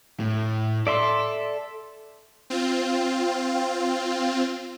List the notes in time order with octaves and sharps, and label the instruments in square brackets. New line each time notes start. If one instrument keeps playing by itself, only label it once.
[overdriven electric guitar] A2
[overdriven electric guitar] A4 [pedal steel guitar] D5 E5 C6
[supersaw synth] C4 F4